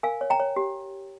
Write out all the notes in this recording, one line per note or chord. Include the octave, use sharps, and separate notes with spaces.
A#4 F5 G#5
C#5
G5 A#5
C#5
G4